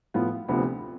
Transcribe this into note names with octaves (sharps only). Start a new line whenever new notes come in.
A2 F3 B3 F4
D2 C3 F3 B3